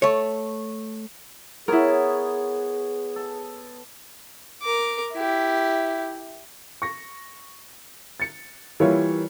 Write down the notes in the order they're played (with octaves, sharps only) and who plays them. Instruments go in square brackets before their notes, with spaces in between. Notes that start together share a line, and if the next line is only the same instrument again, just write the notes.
[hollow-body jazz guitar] A3 C#5
[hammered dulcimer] B3 C#5 [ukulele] E4 A#4 [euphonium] G#4
[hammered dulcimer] A4
[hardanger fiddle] A#4 D6
E4 G4
[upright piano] C#6 A#6
A6 C#7
E3 G3 A#3 E4 F4 C#5